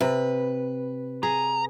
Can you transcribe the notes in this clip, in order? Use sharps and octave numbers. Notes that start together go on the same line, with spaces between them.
C3 B4
G#4 A#5